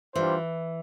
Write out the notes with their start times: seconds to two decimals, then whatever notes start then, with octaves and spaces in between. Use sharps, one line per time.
0.15 E3 G3 D4 F4 C5